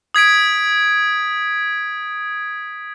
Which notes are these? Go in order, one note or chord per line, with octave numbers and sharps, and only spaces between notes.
D#6 G#6 B6 D7